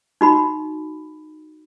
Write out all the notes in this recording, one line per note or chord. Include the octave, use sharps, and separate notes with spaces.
D#4 F#4 B5